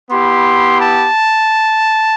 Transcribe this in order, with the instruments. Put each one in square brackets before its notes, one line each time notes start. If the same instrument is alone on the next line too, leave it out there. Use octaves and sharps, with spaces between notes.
[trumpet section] B3 E4 G4 C6
A5